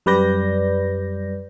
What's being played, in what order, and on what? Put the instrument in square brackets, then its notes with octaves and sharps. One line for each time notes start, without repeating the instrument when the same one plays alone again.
[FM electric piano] F#2 G3 B4 D5 G6 A#6